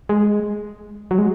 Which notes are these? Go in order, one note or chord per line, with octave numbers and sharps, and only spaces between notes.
G#3
F#3
G#3